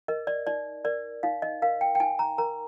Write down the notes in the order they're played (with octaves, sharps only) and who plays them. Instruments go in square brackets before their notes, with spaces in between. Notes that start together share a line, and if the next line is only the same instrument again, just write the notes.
[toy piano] A#4 D#5
D5
D#4 D5
A#4 D5
D#4 F5
D#5
A#4 F5
G5
G5
D#4 G#5
A#5
A#4 A#5